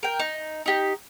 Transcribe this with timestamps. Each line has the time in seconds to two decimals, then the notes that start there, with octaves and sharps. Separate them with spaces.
0.03 A#4 G5
0.20 D#4
0.66 D#4 G4